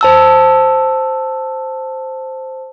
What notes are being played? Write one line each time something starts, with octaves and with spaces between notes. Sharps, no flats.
C5 A5 E6